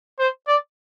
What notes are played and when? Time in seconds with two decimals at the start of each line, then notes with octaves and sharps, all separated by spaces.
0.19 C5
0.47 D5